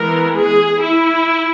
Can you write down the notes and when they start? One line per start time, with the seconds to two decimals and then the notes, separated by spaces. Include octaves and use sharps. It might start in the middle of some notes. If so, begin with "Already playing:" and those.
Already playing: E3 G#3 B3 A#4
0.34 G#4
0.81 E4